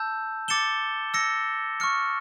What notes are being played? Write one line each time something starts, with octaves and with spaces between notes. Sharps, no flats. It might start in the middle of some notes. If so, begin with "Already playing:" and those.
Already playing: A5 E6 G6
D6 A6 C#7 E7 G7
E6 A#6 C#7
C#6 F6 C#7